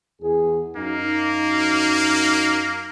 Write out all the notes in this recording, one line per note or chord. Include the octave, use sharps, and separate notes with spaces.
E2 G#4
F#2 A#3 D#4